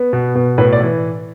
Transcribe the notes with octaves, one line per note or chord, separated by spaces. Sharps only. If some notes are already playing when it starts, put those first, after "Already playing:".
Already playing: B3
B2
B2
A2 B4
D5
E3